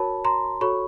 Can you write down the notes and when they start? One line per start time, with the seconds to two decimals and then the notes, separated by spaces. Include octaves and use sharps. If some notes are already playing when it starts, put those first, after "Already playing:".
Already playing: F#4 A#4 C#5 A5 B5
0.25 A#5 C6
0.61 F#4 A4 C#5 B5 C#6